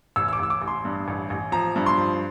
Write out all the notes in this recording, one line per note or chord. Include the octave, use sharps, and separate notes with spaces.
A1 E6
E6
D6
A1 E6
D6
A1
C6
G2
A1
A1
F3 A#5
G2
C6
F3